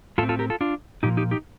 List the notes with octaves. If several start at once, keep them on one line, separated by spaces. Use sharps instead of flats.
A2 A3 C4 F4 A4
F4 A4
G4 A#4
F4 A4
D4 F4
A#2 F3 A#3 D#4 G4
D#4 G4
D#4 G4